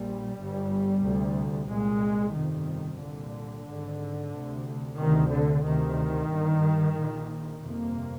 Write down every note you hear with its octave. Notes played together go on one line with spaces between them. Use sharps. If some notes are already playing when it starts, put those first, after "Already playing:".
Already playing: A#1 A#2 G3
G1 G2
D2 C3
C2 A#2 G#3
G1 F2 C3 D#3
C2 A#2 D3
G#1 G#2
D2 C3
D2 C3 D#3
D3
D2 C3 D#3
G1 G2
A#1 A#2
G1 F2 C3 A#3